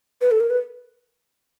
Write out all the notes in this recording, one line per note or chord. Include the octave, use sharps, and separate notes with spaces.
B4
A4
A#4
B4